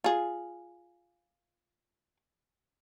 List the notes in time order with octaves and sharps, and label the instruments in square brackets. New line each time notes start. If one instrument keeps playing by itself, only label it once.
[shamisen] F4 G#4